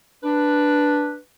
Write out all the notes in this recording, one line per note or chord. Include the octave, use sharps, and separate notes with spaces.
D4 B4